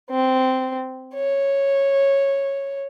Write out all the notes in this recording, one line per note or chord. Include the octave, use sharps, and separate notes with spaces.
C4
C#5